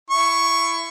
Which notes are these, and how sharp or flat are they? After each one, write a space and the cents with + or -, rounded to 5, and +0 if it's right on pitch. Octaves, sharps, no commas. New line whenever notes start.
E4 +25 C#6 +0